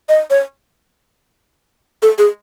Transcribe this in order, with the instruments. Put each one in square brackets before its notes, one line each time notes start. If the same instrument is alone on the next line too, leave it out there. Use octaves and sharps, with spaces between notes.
[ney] D#5
C#5
A4
G#4